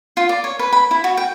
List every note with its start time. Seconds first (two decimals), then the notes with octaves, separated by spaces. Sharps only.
0.17 F4
0.29 D5
0.44 C#5
0.59 B4
0.73 B5
0.91 E4
1.04 F#4
1.17 G5